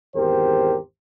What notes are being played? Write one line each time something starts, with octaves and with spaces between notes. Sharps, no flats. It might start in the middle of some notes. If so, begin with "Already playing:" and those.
G#1 E2 G4 A#4 C5